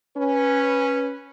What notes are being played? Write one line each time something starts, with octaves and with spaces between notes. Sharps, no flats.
C#4 B4